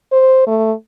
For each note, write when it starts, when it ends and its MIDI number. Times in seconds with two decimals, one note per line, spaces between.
0.12 0.43 72
0.47 0.72 57